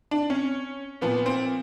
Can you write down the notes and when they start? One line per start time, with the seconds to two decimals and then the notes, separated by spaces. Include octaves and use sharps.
0.11 D4
0.30 C#4
1.01 A#2 F3 B3
1.26 C4